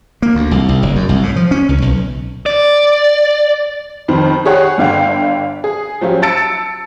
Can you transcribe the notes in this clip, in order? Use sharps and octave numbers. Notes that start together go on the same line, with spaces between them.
A#3
D2
C2
C2
F#1
F#2
C2
A2
F3
C#4
C#2
B1
D5
F2 D#3 C5
G4 G#4 C#5 F#5
G1 D3 F5 G5
G#4
F3 F#3 C#4 F4 G4
A5 E6 A6 C#7 D7